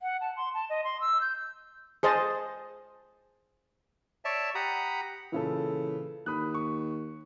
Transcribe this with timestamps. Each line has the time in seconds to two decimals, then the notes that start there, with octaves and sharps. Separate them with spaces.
0.02 F#5
0.21 A5
0.37 C6
0.54 A5
0.70 D#5
0.84 C6
1.01 E6
1.21 G6
2.03 G#4 C5 D#5 A5
4.25 C#5 D5 E5 A5
4.55 G4 F#5 A#5 B5 D#6
5.32 A#2 C#3 E3 A4
6.26 D#2 B5 D#6 F#6
6.55 C#6